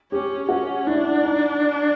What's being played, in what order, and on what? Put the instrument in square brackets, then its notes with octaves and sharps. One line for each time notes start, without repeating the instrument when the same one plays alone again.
[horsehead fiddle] C#4 [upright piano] G4
[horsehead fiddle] C#4 [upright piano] F#4
[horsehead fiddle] D4 [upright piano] E4
[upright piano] D#4